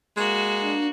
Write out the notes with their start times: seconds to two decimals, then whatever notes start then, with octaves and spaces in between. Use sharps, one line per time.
0.17 G#3 A#3 F#4
0.61 D4